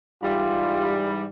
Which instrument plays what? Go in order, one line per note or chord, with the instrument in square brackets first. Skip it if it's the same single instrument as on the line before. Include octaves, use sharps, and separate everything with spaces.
[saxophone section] G#2 E3 G3 [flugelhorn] F4